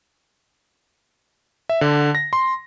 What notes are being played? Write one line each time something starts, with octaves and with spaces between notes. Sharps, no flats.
E5
D3
A#6
C6